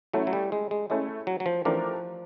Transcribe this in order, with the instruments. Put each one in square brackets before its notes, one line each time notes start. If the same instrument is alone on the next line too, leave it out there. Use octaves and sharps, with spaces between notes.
[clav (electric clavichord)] F#3 [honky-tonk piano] A3 C#4 E4
[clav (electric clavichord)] F#3
G3
G#3
G#3
[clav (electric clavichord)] G#3 [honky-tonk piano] A3 C#4 E4
[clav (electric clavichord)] F#3
F#3
F3
[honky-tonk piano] E3 A3 D4 G4 A#4 [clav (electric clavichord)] F3